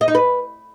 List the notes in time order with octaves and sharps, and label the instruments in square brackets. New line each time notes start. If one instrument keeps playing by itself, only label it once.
[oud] D#5
D#4
B4